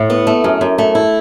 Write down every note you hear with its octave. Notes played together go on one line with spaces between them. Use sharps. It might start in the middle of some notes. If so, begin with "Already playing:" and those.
Already playing: A2
B3
A3
F#2
F#2
A3
E4